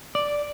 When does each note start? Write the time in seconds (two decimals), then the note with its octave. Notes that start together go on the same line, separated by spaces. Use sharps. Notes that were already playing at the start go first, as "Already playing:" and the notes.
0.15 D5